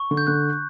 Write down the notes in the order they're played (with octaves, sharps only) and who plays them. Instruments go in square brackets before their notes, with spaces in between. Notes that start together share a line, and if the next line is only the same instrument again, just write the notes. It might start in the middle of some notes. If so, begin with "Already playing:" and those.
Already playing: [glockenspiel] C#6
[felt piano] D3
[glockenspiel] G6
[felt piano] D3 [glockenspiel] F#6